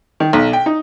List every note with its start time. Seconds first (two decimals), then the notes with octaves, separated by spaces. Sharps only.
0.20 D#3
0.33 B1
0.53 G5
0.66 D#4